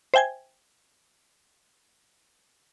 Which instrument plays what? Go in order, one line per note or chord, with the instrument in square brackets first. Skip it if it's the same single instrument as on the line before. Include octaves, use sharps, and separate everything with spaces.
[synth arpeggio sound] C5 E5 G5 G#5 G#6